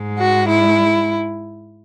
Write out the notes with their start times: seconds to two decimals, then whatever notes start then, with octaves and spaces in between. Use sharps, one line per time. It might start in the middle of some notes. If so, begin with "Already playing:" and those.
Already playing: G#2 G#3
0.17 F#4
0.48 E4